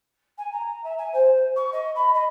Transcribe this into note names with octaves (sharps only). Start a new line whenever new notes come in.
G#5
A#5
E5
G#5
C5
C#6
D#5
B5
D#5